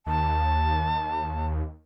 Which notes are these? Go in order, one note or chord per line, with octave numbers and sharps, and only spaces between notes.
D#2 A5